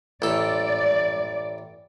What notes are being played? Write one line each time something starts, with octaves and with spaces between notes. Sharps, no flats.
A1 A4 D5